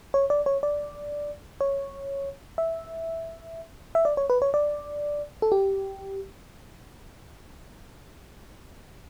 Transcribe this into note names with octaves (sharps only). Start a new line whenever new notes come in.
C#5
D5
C#5
D5
C#5
E5
E5
D5
C#5
B4
C#5
D5
A4
G4